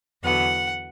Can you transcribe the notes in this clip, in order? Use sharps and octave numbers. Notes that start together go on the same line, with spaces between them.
E2 D3 F#3 B3 F#5